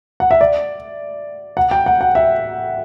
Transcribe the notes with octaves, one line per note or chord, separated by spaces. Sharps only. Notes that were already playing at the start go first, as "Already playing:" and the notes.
F#5
E5
D5
F#5
G5
F#5
F#5
E5